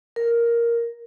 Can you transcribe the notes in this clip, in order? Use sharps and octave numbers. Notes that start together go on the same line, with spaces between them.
A#4